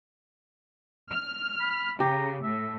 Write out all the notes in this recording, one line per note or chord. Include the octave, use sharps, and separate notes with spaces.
F6
B5
C#3 G4 A#5
A2 E5